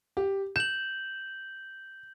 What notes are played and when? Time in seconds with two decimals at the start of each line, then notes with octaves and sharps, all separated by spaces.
0.17 G4
0.56 G6 E7 F#7